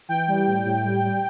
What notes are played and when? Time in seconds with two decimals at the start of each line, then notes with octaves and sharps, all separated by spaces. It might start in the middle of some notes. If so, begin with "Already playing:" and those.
0.09 E3 G5
0.28 G3
0.47 A2
0.65 A2
0.84 G3
1.04 G3